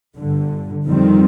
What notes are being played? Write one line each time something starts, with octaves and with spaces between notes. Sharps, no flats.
G1 G2 D3
F2 D#3 G3 C4